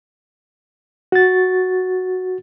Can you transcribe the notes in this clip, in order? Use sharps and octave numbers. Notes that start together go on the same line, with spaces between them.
F#4 A6